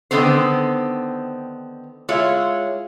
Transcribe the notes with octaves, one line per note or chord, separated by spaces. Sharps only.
D3 D#3 B3 C4 C5
G#3 E4 F4 C#5